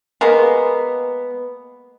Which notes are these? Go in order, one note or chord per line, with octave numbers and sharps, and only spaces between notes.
G#3 A#3 B3